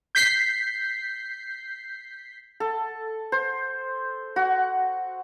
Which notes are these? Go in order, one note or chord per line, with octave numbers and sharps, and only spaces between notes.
G6 B6 C7
A4
C5
F#4